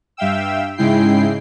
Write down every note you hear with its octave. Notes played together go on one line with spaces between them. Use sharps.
G2 E5 F5 G5 E6
G#2 C#3 G#3 E4 G5 C7